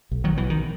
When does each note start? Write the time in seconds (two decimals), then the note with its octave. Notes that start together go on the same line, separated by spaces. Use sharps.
0.11 B1
0.24 D#3 F#3
0.37 B2 E3
0.50 D#3